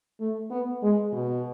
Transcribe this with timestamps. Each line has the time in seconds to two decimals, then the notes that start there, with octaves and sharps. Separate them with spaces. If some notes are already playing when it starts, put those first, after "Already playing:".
0.21 A3
0.51 B3
0.83 G#3
1.13 B2